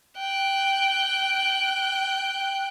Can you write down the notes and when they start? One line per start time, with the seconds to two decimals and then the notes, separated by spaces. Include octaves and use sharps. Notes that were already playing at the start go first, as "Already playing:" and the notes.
0.17 G5 F#6